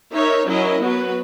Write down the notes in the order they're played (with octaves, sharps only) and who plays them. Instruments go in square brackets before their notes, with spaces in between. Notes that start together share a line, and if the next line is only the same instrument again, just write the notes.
[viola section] D#4 A#4 C#5 E5
F#3 C#4 E4 A#4 D#5
F#3 B3 F#4 B4